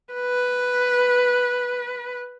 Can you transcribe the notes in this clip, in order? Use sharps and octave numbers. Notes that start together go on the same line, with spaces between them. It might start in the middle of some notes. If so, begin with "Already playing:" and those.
B4